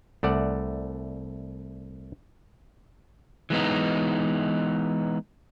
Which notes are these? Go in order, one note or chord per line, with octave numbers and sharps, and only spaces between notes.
C2 A3 D5 F#5
E3 G#3 B3 D#4